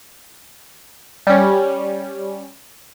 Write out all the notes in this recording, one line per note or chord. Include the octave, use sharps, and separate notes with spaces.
G3 C#4